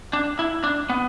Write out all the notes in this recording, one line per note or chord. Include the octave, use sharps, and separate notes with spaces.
D4
E4
D4
B3